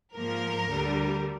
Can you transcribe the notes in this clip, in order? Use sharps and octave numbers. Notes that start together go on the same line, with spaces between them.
G#2 F3 A#3 A#4
D2 D3 G3